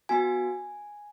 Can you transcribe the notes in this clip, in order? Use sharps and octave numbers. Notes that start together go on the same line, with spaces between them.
B3 F#4 G#5